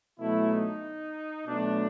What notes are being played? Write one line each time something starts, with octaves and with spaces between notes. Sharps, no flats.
B2 F#3 A3 E4
D#4
B2 F#3 A3 D4